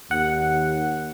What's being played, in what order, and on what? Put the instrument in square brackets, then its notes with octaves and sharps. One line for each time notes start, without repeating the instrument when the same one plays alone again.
[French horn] D#2 [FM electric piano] F#5